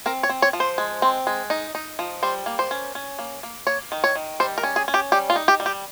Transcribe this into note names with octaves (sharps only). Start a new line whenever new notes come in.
C4 A#4
C#5
C4
C#5
F3
C5
G#3
C4
G#3
D#4
D#4
F3
G3 C5
A#3
C5
C#4
C#4
A#3
A#3
A#3 C#5
D#3
C#5
D#3
G3 C5
A#4
C#4
G#4
C#4
G4
G3 G4
F4
D#4
G4
G3
G4